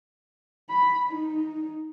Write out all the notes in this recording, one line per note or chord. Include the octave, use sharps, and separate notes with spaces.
B5
D#4